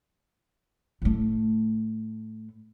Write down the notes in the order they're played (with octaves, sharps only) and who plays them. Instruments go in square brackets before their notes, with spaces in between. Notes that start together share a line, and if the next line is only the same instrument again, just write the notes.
[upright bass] A2 A3